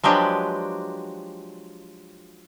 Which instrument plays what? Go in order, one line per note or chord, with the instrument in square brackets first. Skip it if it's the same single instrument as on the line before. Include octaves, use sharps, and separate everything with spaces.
[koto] F3 F#3 G#3 D4 G4 B4